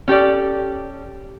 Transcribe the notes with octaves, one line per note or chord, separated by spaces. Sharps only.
C#4 G4 A4 D5